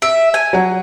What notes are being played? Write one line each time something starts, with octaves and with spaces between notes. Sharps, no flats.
E5 D7
G#5
F#3 F#5